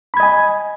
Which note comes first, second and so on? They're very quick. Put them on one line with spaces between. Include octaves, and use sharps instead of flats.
B5 G#6 D#5 G#5